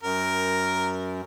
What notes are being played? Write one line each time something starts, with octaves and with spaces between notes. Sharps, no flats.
F#2 A#4